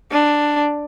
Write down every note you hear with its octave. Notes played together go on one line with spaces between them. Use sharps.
D4